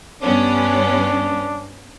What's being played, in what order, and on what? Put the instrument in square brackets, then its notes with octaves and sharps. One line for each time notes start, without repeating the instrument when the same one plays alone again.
[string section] G2 B3 C#4 [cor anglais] D4